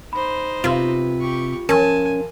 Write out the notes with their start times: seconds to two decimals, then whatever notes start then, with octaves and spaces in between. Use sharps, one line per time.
0.13 D#4 C5 B5
0.64 C3 F4 B4
1.20 G4 C#6
1.69 F3 C#4 A#4 G#5 A5